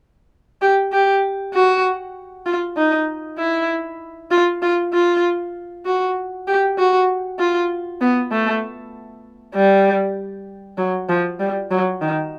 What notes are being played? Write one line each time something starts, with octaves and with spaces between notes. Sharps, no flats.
G4
G4
F#4
F4
D#4
E4
F4
F4
F4
F#4
G4
F#4
F4
B3
A3
G3
F#3
F3
G3
F#3
D#3